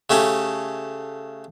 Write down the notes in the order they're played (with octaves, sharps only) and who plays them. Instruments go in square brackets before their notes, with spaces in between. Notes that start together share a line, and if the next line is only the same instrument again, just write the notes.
[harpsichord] C#3 A3 C#4 G4